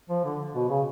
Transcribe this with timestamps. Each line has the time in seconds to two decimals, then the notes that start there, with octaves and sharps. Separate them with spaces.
0.10 F3
0.24 D3
0.55 B2
0.69 C#3